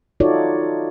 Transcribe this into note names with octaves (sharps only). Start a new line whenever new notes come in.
D#4 F4 F#4 A4 C#5 D5